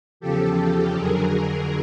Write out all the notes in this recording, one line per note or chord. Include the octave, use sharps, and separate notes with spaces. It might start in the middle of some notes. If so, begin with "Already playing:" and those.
E2 C#3 F3 G4 A4
F2 D3 F#3 G#4 A#4
G#4 A#4